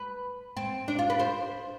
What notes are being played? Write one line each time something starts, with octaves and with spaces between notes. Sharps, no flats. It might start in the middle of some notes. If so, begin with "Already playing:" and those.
Already playing: B4
C4
D4
F4
B4
C5